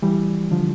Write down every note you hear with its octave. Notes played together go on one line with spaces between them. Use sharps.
E3 G3
D3 F3